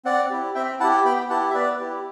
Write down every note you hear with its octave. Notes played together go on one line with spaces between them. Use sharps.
C4 D5 F#5
E4 G4
C4 E5 G5
E4 G4 F#5 A5
B3 G5 B5
E4 G4 F#5 A5
E5
B3 B4 D5
E4 G4